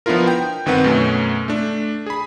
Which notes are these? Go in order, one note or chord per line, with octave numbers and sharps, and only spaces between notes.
F3 B3 D4 E4 F4 A#4
G5
G1 D#3 C4 B4 F#5
F#2 B2 A3 C#4
A3 D4
G#4 B5